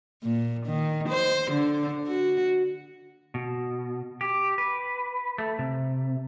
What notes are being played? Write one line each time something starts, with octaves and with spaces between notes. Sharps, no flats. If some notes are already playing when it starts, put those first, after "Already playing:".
A#2
D#3
C5
D3
F#4
B2
G4
B4
A3
C3